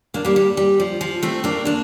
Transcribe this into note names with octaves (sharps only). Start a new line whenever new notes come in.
A#3 D4
G3 A#3
G3
G3
F3
F3
A3 C4
A#3 D4
A#3 D4